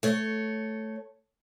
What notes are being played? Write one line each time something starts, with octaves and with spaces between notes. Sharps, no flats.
A3 C#5